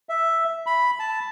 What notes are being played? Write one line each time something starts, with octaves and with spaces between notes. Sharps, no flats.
E5
B5
A5